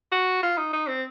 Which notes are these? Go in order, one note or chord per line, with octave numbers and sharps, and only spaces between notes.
F#4
F4
D#4
D#4
C4